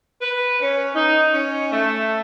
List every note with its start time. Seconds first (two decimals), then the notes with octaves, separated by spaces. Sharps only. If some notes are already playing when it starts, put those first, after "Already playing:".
0.22 B4
0.61 C#4
0.95 D#4
1.33 C#4
1.71 A3